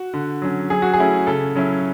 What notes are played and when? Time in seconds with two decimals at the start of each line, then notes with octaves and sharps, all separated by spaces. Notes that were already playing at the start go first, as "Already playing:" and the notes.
Already playing: F#4
0.13 D3
0.42 F#3 C#4
0.70 F#3 G#4
0.82 F#4
0.93 G#4
0.98 A3 C#4 E4
1.27 C#3 A4
1.56 F#3 C#4 E4